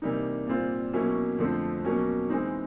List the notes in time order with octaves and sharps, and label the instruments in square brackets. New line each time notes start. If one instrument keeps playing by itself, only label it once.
[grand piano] C3 E3 G3 A#3 D#4
A#2 G3 C4 F4
B2 F#3 A#3 C#4 E4
F2 D3 F3 A3 C4
B2 F#3 A#3 C#4
E3 G#3 C4 D#4